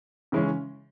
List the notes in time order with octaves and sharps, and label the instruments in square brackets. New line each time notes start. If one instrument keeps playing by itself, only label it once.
[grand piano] C#3 E3 G#3 C#4